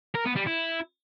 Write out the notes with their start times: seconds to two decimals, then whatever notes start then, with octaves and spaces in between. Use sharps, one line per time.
0.15 A#4
0.26 B3
0.36 G3
0.47 E4